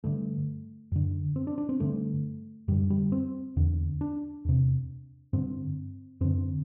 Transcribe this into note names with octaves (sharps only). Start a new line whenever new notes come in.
G2 D3 A3
F#2 D3
C4
D4
D4
C4
G2 D3 A3
F#2 D3 G3
G3
C4
E2 D3
D4
E2 C3
G2 D3 C4
F#2 D3 C4